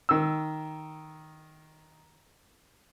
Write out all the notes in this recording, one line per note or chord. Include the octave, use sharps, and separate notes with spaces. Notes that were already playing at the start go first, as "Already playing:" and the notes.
D#3 E6